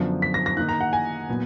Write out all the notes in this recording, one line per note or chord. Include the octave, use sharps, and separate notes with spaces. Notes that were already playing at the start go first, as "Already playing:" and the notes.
Already playing: F#2 D3 F3 B3
B6
A#6
A#6
D#3 A#3 D#4 F#6
A#5
F#5
G#5
A#2 F#3 B3